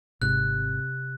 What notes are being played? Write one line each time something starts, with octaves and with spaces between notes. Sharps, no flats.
G#1 G#2 C3 F#6